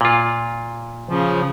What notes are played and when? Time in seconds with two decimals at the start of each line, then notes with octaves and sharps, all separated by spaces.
0.01 A#2 F4
1.09 C#3 F3